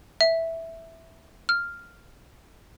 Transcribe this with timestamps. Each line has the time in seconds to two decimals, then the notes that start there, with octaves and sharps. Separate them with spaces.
0.21 E5
1.49 F6